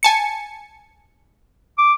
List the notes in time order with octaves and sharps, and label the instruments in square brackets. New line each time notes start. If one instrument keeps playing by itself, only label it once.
[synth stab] G#5 A5 C#7
[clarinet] D6